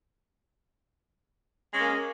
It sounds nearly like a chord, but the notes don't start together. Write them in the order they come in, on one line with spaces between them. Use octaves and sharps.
G#3 C#4 A#3